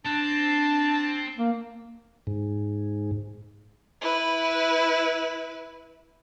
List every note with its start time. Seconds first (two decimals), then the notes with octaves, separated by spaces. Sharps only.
0.05 C4 D4 A5
1.38 A#3
2.27 G#2
4.01 E4 B4